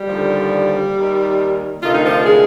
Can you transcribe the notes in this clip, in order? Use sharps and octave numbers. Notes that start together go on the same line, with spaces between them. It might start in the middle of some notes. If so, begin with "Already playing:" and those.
Already playing: G3
D#2 D3 F3
D#2 D#3
D2 C3 D#3 F4
D#4
F3 F4
G#3 G#4